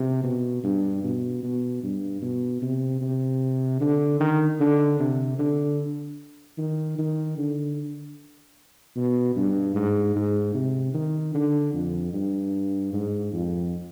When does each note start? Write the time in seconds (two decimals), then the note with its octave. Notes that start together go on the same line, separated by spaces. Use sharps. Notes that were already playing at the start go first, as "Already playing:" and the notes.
Already playing: C3
0.23 B2
0.63 G2
1.03 B2
1.43 B2
1.83 G2
2.22 B2
2.62 C3
3.01 C3
3.80 D3
4.20 D#3
4.60 D3
4.99 C3
5.39 D3
6.58 D#3
6.98 D#3
7.38 D3
8.96 B2
9.36 G2
9.75 G#2
10.16 G#2
10.55 C3
10.94 D#3
11.34 D3
11.74 F2
12.13 G2
12.93 G#2
13.32 F2